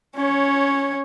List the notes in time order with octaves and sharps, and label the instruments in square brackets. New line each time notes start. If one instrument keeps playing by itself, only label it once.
[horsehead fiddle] C#4 C#5